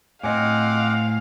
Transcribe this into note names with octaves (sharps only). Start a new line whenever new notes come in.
A2 C4 D#5 F5 F#5 G#5 D6